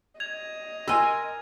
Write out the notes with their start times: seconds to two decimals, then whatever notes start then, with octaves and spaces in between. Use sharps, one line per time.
0.20 D#5 G#6 F7
0.88 A#4 G#5 C6 E6